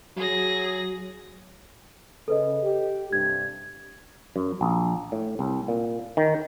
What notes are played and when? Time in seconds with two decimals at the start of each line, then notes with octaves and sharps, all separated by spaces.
0.17 F#3 G#4 A#6
2.28 C#3 A4 B4 D#5
2.64 G4
3.13 G2 C3 G#6
4.36 F#2
4.61 A#1
5.12 A2
5.39 C2
5.68 A#2
6.17 D#3